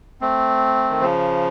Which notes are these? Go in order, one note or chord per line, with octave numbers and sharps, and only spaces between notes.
A3 C4
D#3
C#3 F3